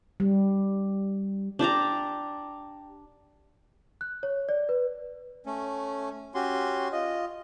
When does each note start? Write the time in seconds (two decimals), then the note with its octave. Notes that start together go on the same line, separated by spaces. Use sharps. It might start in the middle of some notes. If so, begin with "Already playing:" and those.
0.20 G3
1.59 D4 G4 D5 A#5
4.01 F#6
4.23 C#5
4.49 D5
4.69 B4
5.46 A3 C#4
6.35 C#4 F#4 G4 C6
6.92 F4 D#5